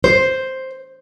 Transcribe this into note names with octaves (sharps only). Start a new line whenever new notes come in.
C5